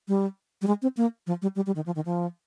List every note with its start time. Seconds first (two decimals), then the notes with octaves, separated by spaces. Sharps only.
0.08 G3
0.62 G3
0.67 G#3
0.82 C4
0.97 A#3
1.27 F3
1.42 G3
1.56 G3
1.66 G3
1.76 D#3
1.86 F3
1.95 D#3
2.05 F3